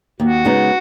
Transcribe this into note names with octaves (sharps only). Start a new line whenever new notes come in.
D#2 F#4
C#3 G#3 B3 D#4